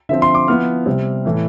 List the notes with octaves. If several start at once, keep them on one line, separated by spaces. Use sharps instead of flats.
D3 F3 C4 E5
C6
D6
F3 B3 E4 F6
C3 G3 C4
A2 E3 A3